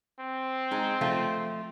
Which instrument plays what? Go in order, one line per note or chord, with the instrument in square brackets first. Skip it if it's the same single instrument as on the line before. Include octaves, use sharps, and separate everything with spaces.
[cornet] C4
[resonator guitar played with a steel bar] G#3 D#4
F3 A3 F4